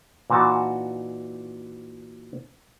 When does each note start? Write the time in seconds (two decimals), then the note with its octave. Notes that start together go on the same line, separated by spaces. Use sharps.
0.30 A#2 E3 D#4 F#4 A5